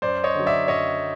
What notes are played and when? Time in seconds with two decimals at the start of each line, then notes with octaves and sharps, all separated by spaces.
0.02 F#2 C5 D5
0.24 C#5 D#5
0.35 D3 F#3
0.46 D5 E5
0.68 F#2 C#5 D#5